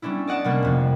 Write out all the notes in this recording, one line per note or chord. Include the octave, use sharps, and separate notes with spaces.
G3 B3 C#4 D4 E4
D5 D#5 F#5 A5
C3 G3 A#3 B3 C#4
F2 C3